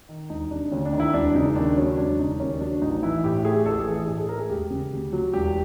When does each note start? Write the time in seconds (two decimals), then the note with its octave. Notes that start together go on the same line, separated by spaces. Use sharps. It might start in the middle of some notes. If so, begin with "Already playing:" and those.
0.09 D#3
0.30 E1 D#4
0.51 C3 D4
0.72 D2 C#4
0.86 D4
0.93 D#3
1.00 E4
1.14 E1 D4
1.35 C#3 D#4
1.56 D#2 D4
1.77 F#3 C#4
1.98 E1 D4
2.19 C#3 D#4
2.39 D#2 C#4
2.61 F#3 D4
2.82 A1 D#4
3.03 E3 E4
3.24 A2 G4
3.45 A3 G#4
3.66 A1 A4
3.80 G#4
3.87 E3
3.94 G#4
4.08 A2 G#4
4.18 A4
4.29 A3 A#4
4.39 G#4
4.50 E1 G4
4.70 C#3
4.92 D2
5.13 F#3
5.34 E1 G4